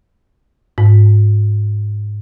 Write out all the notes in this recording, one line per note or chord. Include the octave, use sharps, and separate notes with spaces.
G#2